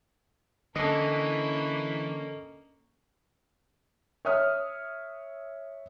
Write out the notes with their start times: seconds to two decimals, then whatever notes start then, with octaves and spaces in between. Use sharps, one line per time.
0.76 D3 E3 A#3 C#4 A4 D#5
4.25 C#5 E5 D#6 F6